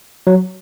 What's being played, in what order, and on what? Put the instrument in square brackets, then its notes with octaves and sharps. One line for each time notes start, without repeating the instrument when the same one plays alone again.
[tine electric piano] F#3